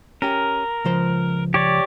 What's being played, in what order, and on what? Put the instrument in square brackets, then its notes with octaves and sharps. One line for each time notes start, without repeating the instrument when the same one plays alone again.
[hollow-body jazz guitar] C#4 G4 [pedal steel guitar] A#4
[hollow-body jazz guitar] C#2 F3 C5
[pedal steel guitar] G4 C#5 D5